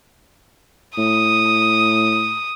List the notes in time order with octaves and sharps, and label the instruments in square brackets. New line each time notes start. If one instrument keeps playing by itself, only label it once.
[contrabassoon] A2 [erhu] D#6